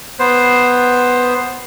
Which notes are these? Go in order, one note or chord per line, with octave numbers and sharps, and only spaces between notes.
B3 C5